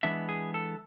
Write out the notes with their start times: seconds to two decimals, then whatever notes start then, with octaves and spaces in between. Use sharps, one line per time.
0.03 E3 G#3 B3 D4 E5
0.29 G#4
0.54 A4